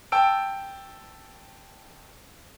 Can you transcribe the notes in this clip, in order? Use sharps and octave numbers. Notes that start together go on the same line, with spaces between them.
G5 A5 E6 D7